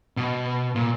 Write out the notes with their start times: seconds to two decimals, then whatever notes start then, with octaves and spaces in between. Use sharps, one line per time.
0.17 B2
0.76 A#2